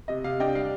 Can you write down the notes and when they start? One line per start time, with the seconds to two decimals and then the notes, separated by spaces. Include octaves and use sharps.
0.08 C3 D#5
0.24 C3 F5
0.40 D4 D#5 G5
0.55 G3 F5